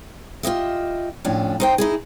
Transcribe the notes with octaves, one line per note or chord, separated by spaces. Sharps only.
F4 G4 D#5 E5
F2 A2 C#4 D4
D#4 C5 G5
D#4 E4 G#4